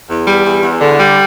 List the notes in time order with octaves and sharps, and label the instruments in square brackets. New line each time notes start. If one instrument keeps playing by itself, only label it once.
[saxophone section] E2
G3
E2
E2
D3
G3